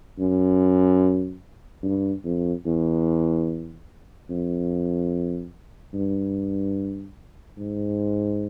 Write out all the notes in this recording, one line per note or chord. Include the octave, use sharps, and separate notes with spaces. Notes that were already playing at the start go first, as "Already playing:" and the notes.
F#2
G2
F2
E2
F2
G2
G#2